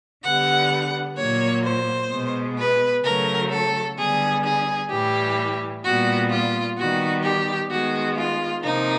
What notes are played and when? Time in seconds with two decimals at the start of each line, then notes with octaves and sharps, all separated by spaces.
0.23 D3 G3 B3 F#5
1.16 A#2 F#3 A#3 C#5
1.63 C5
2.10 B2 G#3 B3
2.57 B4
3.03 C#3 F#3 A3 A#4
3.50 A4
3.97 D3 G3 B3 G#4
4.43 G#4
4.89 A2 E3 G3 G4
5.83 A#2 G3 B3 F#4
6.30 F4
6.76 D#3 G3 B3 F#4
7.23 G4
7.70 D#3 G#3 B3 F#4
8.17 F4
8.63 C3 F3 A#3 D#4